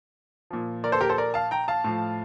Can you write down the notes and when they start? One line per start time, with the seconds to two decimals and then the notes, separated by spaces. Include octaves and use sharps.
0.51 A#2 F3
0.84 A#4 D5
0.92 A4 C5
1.01 G4 A#4
1.09 A4 C5
1.18 A#4 D5
1.34 F5 A5
1.51 G5 A#5
1.68 F5 A5
1.84 A2 F3